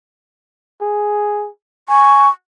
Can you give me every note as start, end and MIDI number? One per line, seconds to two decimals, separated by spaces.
0.82 1.49 68
1.89 2.28 80
1.89 2.29 85